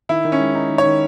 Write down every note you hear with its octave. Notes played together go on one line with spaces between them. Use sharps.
D#3 E4
D#3
C#4
G#3
D#4
D#3
C#5
D#3